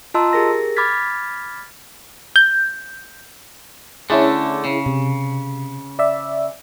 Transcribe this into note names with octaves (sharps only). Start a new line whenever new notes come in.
F4 D#5 A5 A#5 C6 E6
G4 G#4 A#4 A#6
B5 D6 F6 G#6 A6 B6
G6
D3 A3 C#4 E4 G#4
C#3
C3
D5 E5